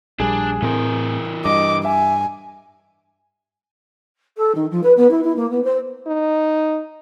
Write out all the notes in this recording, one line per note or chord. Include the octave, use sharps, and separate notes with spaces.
A#1 G3 D4 G#4
A2 E3 C4 A#4
G2 D#5 D6
E5 G#5
A4
D#3
F3
B4
B3
E4
E4
A#3
B3
C5
D#4